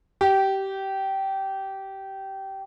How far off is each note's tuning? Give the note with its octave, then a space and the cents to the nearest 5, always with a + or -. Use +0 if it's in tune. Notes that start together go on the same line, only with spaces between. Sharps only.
G4 -20